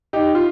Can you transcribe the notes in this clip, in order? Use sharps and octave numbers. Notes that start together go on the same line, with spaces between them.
D#4 G4
F4